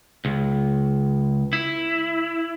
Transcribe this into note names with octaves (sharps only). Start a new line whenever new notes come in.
C#2
E4